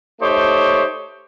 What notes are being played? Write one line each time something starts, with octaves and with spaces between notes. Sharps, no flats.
A3 D#4 G4 C5 C#5